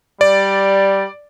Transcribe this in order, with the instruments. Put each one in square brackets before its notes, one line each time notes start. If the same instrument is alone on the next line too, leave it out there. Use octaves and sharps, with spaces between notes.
[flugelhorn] G3 [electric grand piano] D5